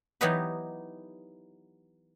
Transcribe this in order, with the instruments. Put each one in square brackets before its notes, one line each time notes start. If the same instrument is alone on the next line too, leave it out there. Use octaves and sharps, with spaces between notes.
[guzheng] E3 F#3 B3 D#4 G4 B4